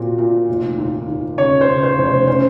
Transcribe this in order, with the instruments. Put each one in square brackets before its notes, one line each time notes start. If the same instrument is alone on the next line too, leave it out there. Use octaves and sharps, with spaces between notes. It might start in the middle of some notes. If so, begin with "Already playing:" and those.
Already playing: [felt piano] A#2 C4 F#4
A#2
F1
D#2
D#2
[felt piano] C#3 [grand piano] C#5
[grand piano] C5
[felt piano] C#3
[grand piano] C5
[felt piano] F1
[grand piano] C5
[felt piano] C#4 [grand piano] C5